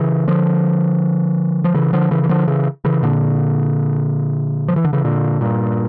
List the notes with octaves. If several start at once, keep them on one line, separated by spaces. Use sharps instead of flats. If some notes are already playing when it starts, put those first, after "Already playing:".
Already playing: C#3 E3
D3 F3
F3
C#3 E3
D3 F3
C#3 E3
E3
D3 F3
C#3 E3
C#3 E3
A#2 D3
F3
E3
D3
C#3 E3
A#2 D3
G2 A#2